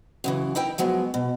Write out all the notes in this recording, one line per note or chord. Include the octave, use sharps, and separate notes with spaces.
F#2 C#3 E3
D#4 E4 A#4 G5
F3 F#3 G#3 B3
B2